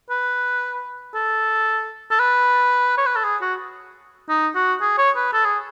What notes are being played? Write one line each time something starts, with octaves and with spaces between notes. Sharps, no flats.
B4
A4
A4
B4
C#5
B4
A4
G#4
F#4
D#4
F#4
G#4
C#5
B4
A4
G#4